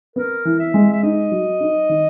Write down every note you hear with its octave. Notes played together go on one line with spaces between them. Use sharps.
B3 A#4
E3
E5
G#3
E5
D#4 D#5
F#3
D#4
D#3